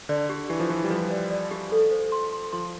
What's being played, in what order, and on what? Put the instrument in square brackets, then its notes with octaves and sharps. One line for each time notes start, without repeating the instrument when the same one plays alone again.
[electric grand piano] D3 [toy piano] D5
[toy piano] G4
[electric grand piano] E3 [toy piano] G4
[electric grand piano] F3
[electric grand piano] E3 [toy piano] G4
[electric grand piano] G3
[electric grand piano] F3 [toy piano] B4
[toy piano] D5
D5
G4
A4
C5
C6
C6
[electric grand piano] F3 [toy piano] C6